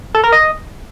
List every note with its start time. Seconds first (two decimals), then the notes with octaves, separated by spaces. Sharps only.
0.15 A4
0.23 A#4
0.32 D#5